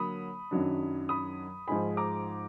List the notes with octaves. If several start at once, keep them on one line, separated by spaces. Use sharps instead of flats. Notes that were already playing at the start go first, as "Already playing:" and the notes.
Already playing: D3 F#3 A#3 B5 D#6
F#2 D#3 F#3 D4
B5 D#6
G#2 F3 G#3 D#4 G#5 B5
A#5 D6